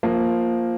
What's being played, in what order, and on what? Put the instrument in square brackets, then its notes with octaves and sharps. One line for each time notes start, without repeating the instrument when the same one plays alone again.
[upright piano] F3 A#3